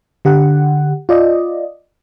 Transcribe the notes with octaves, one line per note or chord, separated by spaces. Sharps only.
D3 G4 F#5
F4 D5 D#5